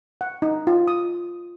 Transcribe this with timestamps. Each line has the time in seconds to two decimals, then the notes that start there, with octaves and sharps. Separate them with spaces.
0.21 F#5
0.42 D#4
0.67 F4
0.88 D#6